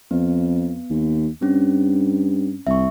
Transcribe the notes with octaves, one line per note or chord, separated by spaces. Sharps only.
F2 B3
D#2
G2 C4 C#4
C2 E5 C#6